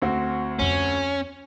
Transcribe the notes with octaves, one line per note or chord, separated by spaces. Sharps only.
D2 C4 F#4
F2 C#4 F4